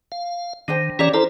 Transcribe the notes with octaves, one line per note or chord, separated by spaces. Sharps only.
F5
D#3 D4 C5 G5
E3 C#4 G4 C#5 D5 A#5
D4 E4 A4 A#4 C5